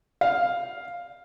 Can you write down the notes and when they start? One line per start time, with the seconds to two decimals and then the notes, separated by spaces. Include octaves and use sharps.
0.21 F5